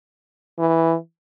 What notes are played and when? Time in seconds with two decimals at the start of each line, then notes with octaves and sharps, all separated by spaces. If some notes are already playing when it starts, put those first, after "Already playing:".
0.59 E3